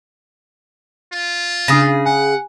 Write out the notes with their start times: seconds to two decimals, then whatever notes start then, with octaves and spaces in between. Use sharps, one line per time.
1.13 F4
1.68 C#3 D4 G#4 D#6 A#6
2.06 F#5 G#5